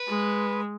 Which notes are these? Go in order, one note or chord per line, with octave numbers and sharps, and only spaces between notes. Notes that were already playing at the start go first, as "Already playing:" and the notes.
Already playing: B4
G#3